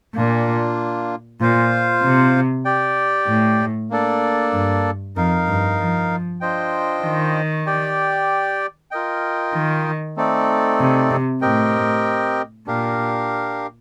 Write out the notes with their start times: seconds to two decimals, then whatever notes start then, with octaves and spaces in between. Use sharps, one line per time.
0.15 A#2 A#3 D4 F4
1.40 A#2 F4 C5 F5
2.03 C3
2.65 G4 D5 G5
3.27 A2
3.90 A#3 D4 A4 D5
4.53 G2
5.16 F2 D#4 A#4 F5
5.48 G2
5.78 F3
6.41 D4 F4 C5 D#5 G5
7.03 D#3
7.66 G4 D5 G5
8.91 F4 A#4 D#5 G5
9.54 D#3
10.16 A3 C4 D#4 A4 D5
10.80 C3
11.11 C3
11.42 A2 C4 G4 A#4 D#5 G5
12.67 A#2 D4 G4 A#4 F5